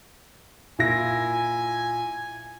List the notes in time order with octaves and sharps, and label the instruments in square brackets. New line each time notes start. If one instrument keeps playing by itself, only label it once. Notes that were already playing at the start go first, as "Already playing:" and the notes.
[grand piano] A#2 E4 A#6 [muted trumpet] G#5